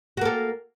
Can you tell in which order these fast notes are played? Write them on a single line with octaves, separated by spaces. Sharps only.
F#4 A#3 A4